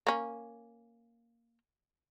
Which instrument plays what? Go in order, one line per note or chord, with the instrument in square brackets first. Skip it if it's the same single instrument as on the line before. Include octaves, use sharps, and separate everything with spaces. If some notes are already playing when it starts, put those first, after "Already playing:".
[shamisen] A#3 C#4